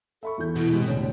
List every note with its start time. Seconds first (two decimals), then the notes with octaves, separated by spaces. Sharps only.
0.23 A4 E5 B5 C#6
0.38 E2 E3 G6
0.56 B2 E4
0.72 A2 C3 G#3
0.88 E1 A2 D3 C#5